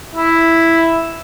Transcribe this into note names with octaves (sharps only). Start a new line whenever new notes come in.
E4